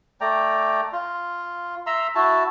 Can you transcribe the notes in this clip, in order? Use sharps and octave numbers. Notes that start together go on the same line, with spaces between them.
A3 D5 G5 A#5
F4
E5 A#5 C6 E6
E4 F#4 A5